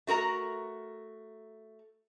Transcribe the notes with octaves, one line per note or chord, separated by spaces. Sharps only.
A3 F#4 A#4 A#5